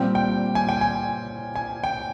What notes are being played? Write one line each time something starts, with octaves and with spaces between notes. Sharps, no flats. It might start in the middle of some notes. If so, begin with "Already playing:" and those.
Already playing: A#2 G3 C4 G5
G5
G#5
G5
G#5
G#5
G5